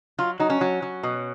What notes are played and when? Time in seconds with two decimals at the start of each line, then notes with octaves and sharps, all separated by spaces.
0.18 F#3 F4
0.40 F#3 D#4
0.50 C#4
0.61 F#3
0.82 F#3
1.03 B2